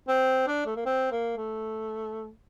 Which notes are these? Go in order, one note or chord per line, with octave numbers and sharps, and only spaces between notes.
C4
D4
A3
A#3
C4
A#3
A3